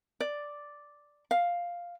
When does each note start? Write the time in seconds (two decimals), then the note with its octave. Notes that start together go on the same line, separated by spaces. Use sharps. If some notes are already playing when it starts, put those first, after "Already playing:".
0.20 D5
1.31 F5